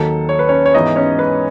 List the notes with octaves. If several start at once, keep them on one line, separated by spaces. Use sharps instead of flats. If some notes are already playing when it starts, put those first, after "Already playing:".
Already playing: D#2 D#3 F#3 A4
C#5
B4
C#4 C#5
C#5
G#2 E3 G#3 B3 D#4 D#5
C#4 C#5
B4